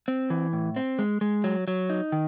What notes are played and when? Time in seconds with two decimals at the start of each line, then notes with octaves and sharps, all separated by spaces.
0.08 C4
0.30 E3
0.53 A2
0.76 C4
0.99 G#3
1.21 G#3
1.44 F#3
1.68 F#3
1.90 D#4
2.12 D#3